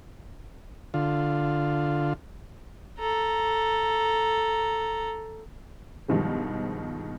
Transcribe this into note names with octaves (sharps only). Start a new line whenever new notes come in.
D3 F4
A4 A#5
G2 B2 D#3 F3 G#3